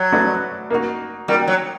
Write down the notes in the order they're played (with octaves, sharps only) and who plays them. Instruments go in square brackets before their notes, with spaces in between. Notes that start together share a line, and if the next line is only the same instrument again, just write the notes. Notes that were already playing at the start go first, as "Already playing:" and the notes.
Already playing: [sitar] F#3
[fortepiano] A3 D4 F#4 B4 D#5
A#3 D#4 F#4
[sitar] G3 [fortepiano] A#3 D#4 F#4
[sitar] F#3